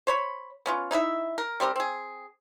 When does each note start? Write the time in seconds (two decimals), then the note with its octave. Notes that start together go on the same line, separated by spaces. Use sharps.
0.07 C5 C#5 B5
0.66 B3 C#4 F4
0.91 D#4 E4 A#4 E5
1.38 A#4
1.60 G3 C4 G4 A#4
1.76 C4 G#4